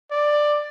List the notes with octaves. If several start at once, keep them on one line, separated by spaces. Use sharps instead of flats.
D5